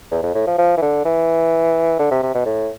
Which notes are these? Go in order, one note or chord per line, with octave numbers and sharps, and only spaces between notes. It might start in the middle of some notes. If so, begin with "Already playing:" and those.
E2
F2
A2
F3
F3
E3
D3
E3
D3
C3
C3
B2
A2